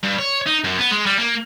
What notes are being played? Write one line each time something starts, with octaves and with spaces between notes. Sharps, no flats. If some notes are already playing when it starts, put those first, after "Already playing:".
G2
C#5
D#4
F#2
B3
G#3
G3
A#3